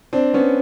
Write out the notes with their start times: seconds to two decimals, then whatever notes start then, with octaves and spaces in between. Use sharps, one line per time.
0.13 C4 D4
0.34 B3 C#4